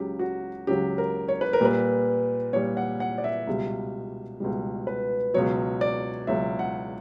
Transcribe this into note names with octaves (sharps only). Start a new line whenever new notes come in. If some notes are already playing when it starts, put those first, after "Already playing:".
Already playing: C#2 C#3 F#3 G4
F#4
C#2 C#3 F#3 G4
A#4
C#5
B4
A#4
A#2 G3 B4
A#2 G3 C#5
F#5
F#5
D5
E5
C#2 B2 G3
C#2 B2 G3
B4
C#2 B2 F#3 C#5
D5
C#2 B2 F#3 E5
F#5